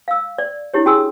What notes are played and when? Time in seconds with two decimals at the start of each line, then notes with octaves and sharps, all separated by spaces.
0.08 F5 E6
0.38 D5
0.74 D4 E4 G4 C#5
0.86 C#4 F#4 G#4 G#5 D#6 E6